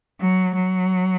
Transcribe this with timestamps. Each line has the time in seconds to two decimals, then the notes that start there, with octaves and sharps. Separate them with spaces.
0.20 F#3
0.55 F#3